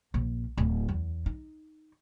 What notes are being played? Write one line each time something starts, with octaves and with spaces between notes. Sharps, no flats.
A#1
D1
E2
D#4